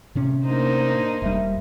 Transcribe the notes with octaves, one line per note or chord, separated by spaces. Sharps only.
A2 C3 C#4
A#3 D4 D#4 C5
E1 G3 E5